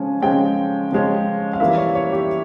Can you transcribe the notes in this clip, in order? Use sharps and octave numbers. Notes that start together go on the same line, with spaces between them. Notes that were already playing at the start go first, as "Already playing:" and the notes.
Already playing: C#3 F3 G#3 C#4 G#5
C#3 F3 G#3 C#4 G5
C#3 F3 G#3 C#4
F5
E3 G3 A#3 E4 E5
C#5
C#5
G4